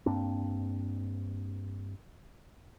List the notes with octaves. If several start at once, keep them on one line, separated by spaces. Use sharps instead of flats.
G2 A#3 C4 D4